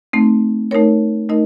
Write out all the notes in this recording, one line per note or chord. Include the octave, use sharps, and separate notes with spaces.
A3 C4 D#4
A3 D#4 A#4 C#5
A3 D#4 A#4 D#5